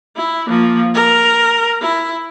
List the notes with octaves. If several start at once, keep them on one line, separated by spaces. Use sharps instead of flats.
E4
F3 A#3
A#4
E4